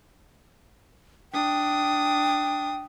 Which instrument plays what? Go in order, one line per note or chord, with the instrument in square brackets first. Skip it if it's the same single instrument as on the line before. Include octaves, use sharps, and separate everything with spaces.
[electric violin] D4 D#6 [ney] G5